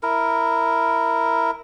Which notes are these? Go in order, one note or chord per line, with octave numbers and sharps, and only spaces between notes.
E4 A#4